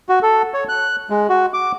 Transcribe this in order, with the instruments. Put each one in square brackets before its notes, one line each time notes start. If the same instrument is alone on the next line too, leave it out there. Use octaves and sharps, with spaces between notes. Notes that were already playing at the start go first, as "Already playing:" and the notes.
[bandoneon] F#4
A4
C#5
F#6
G#3
F#4
D6